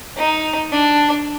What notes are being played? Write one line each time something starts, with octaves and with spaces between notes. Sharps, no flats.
D#4
D4